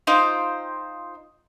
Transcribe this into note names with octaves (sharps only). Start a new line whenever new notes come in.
D#4 F4 C5 G5